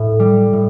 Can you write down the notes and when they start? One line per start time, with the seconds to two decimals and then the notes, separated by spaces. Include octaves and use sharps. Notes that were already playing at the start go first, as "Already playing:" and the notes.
Already playing: A2
0.19 G3
0.53 A2